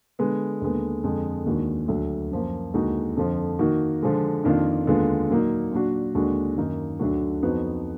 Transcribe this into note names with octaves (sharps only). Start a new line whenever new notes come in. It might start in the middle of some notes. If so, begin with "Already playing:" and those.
D3 G#3 B3
D#2 D3 G#3 B3
F2 D3 G#3
D#2 D#3 G#3 D4 F#4
D2 D3 F#3 D4
F#2 F3 A#3
D#2 D3 G#3 D#4 F#4
F2 D3 F3
D#3 A#3 D#4 F#4
D3 F3 G#3
F2 D#3 A#3 D4 F4
D#2 D3 G#3 B3 F4
A#2 F#3 A#3 D#4
A#2 F#3 D4 F#4
D#2 D3 G#3 D4 F#4
F#2 D#3 A#3 D#4
D2 D3 F#3 D4 F#4
F2 F3 B3 D#4 F#4